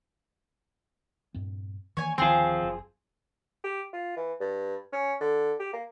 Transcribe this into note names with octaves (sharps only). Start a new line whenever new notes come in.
G2 A#2 C4
D#3 E3 A#3 C#5 G#5
D1 D#3 F3 C4 G#4
F#1
G4
F4
E3
G2
C#4
D3
G4
A#3